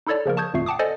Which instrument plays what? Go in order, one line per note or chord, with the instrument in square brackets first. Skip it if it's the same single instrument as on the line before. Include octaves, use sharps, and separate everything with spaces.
[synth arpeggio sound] D#4 E4 A4 C#5 D5 A5
C#3 F3 A#3 A#4
A5 C#6 D#6 G6 G#6
G#1 F2 A#2 A3 C#6 C7
F#5 G5 A5 D6 D#6
A4 C5 D5 D#5 F#5 G#5